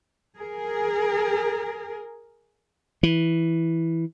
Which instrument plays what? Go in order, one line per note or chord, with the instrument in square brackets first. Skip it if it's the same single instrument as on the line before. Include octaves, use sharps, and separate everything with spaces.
[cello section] G#4 A#4
[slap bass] E3